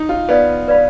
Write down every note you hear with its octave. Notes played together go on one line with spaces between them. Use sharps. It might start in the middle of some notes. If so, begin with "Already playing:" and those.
Already playing: D#4
F4
B3 B4 D5 F5 B5
B4 D5 F5 B5